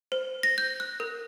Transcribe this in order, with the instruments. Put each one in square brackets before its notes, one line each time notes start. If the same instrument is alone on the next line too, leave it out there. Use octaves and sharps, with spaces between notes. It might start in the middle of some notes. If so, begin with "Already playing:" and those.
[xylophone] C5
A#6
G6
F#6
A#4